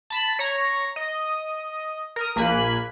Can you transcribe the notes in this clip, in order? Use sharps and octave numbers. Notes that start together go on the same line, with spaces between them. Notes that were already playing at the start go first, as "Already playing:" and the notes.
A5 B5 B6
C#5 A#5
D#5
A#4 D#6
A#1 A#3 G#5 B5 F#6